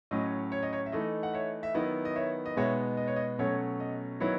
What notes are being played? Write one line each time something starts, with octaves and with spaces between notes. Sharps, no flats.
A2 F#3 C#4 D#5
C#5
D#5
C#5
E5
E3 A3 D#4 D#5
F#5
C#5 E5
E5
D#3 F#3 B3 E4 D#5
D#5
C#5 E5
D#5
B2 G#3 B3 D#4 C#5 E5
D#5
C#5
D#5
B2 F#3 A3 C#4 C#5
D#5
D#3 F#3 B3 E4 C#5